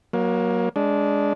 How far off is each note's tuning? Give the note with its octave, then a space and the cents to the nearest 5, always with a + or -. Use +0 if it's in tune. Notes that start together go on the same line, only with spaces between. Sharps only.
F#3 +0 A#3 +20
G#3 +0 D4 -20